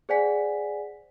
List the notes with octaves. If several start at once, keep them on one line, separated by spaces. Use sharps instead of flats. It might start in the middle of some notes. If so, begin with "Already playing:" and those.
G#4 C5 D5 F#5 G#5 B6